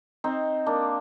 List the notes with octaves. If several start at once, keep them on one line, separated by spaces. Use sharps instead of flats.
C4 D#4
A#3 D4